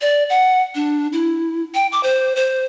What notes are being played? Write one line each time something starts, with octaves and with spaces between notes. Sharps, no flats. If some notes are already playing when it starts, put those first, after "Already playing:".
D5
F#5
D4
E4
G5
D6
C5
C5